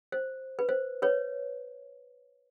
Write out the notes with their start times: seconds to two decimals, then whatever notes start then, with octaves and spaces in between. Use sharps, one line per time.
0.12 C5
0.59 B4
0.69 C5
1.02 B4 C#5